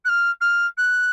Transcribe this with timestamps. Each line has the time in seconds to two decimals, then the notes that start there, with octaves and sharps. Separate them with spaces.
0.05 F#6
0.08 F6
0.41 F6
0.77 F#6